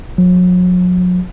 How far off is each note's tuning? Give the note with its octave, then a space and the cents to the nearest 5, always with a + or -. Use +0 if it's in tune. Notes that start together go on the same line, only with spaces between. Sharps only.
F#3 -40